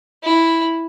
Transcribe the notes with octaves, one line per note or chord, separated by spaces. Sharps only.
E4